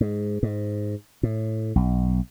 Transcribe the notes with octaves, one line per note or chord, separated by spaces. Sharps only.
G#2
G#2
A2
B1